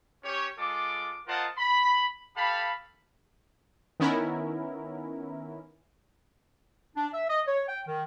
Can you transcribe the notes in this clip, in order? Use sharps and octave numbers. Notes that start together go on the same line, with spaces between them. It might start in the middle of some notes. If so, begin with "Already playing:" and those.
C#4 G4 C#5
G#3 F4 A4 D6
F4 A#4 C5 D#5 F#5 A5
B5
G4 A4 F5 A5 B5
D#3 B3 C#4 E4 A#4
D4
E5
D#5
C#5
G5
D#3